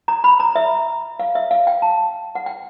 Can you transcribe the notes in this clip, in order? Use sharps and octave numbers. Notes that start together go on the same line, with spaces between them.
A#5
B5
A#5
E5
F5
E5
F5
G5
A5
F#5
G5